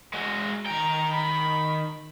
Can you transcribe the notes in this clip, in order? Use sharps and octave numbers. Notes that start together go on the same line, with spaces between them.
G#3 F#4
D#3 G5 A#5
B5